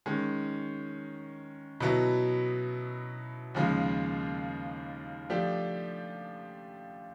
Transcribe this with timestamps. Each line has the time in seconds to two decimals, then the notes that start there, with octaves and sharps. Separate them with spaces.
0.06 D#3 G#3 C#4
1.80 B2 F#3 B3 E4
3.55 D#2 C#3 F3 G#3
5.29 F3 A3 D4 G4